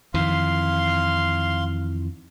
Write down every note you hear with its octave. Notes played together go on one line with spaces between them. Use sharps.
F2 D#3 E3 F5 C6